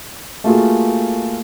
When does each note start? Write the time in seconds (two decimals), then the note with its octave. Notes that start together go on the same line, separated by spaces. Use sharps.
0.44 A3 A#3 F4 F#4 G#4